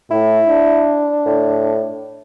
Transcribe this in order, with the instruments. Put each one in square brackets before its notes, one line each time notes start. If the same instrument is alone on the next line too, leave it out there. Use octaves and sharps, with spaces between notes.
[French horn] A2 [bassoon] E4
[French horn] D4
[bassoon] A2